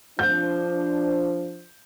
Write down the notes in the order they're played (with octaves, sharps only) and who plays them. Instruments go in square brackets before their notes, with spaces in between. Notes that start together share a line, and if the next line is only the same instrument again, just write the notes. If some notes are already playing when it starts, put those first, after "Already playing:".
[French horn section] F3 C5 [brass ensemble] D4 [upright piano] G6